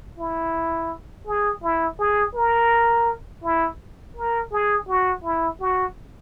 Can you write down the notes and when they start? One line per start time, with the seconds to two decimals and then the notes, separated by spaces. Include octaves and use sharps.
0.18 E4
1.27 G#4
1.63 E4
1.99 G#4
2.35 A#4
3.44 E4
4.17 A#4
4.52 G#4
4.88 F#4
5.24 E4
5.60 F#4